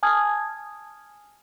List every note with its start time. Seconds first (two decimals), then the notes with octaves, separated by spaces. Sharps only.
0.03 G#5 A5 D#6 F6 G#6